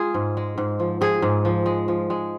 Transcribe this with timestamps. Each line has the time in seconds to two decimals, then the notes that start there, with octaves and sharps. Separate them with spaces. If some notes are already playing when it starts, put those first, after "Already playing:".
Already playing: G#3 F4 G#4
0.14 G#2
0.37 G#3
0.58 G#2
0.80 F3
1.01 F3 G#4
1.22 G#2
1.45 F3
1.66 G#3
1.88 F3
2.10 G#3